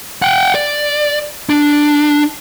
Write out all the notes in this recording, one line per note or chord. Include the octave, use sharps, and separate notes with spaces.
F#5 G5
D5
D4